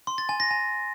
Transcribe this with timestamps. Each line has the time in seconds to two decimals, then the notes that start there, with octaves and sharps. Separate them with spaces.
0.07 C6
0.18 A6
0.29 G#5
0.40 A#6
0.51 G#5